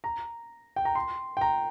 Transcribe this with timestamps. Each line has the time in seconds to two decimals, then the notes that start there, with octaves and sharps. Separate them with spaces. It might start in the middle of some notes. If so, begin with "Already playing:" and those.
0.04 A#5
0.76 G5
0.85 A#5
0.95 C6
1.37 G5
1.41 A#5